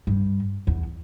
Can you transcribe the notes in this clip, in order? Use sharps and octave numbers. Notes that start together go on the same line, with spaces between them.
G2
E2